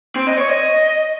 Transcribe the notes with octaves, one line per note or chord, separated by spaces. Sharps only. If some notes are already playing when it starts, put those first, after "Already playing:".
C4
D#5
C#5
D#5